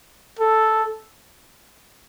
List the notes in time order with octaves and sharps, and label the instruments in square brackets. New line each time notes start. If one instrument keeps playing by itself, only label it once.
[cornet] A4